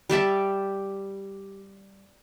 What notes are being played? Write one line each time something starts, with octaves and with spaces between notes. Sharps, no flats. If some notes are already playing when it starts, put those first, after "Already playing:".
G3 G4 E5 A5